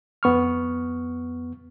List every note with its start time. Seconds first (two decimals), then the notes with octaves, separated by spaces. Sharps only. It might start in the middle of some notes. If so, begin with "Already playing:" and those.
0.23 F2 B3 C#6 F6